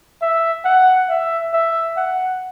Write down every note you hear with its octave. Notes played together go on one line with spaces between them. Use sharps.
E5
F#5
E5
E5
F#5